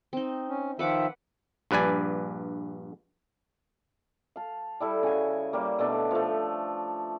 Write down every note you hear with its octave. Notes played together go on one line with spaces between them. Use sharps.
C4 D#4
C#4
D#3 F3 B4 E5 F#5 D6
A#1 G2 B4 D5 G#5
F5 A5
G3 E4 A4
C#3 F#4 G#5
G3 A#3
B2 A3 D4
F3 A3